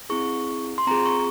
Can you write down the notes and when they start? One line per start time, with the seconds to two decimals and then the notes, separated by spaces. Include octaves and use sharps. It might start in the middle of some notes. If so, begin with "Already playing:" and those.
0.10 C4 E4 G#4 C#6
0.78 C6
0.87 C4 F4 G#4 A#5
1.06 C#6